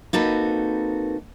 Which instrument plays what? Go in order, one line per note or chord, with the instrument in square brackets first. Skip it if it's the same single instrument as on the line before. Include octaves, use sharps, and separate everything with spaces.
[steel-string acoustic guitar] A#3 C4 D#4 F#4 A4 B4